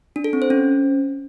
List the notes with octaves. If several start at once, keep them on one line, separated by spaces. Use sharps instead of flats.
D4
A4
C4
C5
C#4